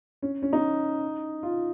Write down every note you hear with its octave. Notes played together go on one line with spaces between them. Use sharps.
C#4
C#4
D#4
F4